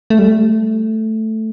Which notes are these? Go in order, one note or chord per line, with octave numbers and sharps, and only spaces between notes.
A3
G3
A3